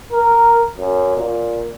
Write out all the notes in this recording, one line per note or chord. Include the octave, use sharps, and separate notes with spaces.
A#4
F#2
A#2